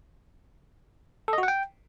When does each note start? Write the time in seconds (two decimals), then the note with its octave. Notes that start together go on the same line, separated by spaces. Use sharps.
1.28 A4
1.33 D#5
1.38 F#4
1.43 F#5
1.48 G5